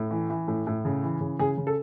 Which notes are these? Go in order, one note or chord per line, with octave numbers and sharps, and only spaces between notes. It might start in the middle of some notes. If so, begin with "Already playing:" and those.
Already playing: A2
E3
E3
A2
A2
C#3
E3
C#3
C#3 G#4
C#3
A4